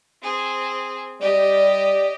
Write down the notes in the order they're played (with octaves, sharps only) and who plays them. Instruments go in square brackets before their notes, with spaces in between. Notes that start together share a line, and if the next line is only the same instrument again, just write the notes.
[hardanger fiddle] C4 G#4
[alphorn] G3 [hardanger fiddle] G4 D#5 [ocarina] D5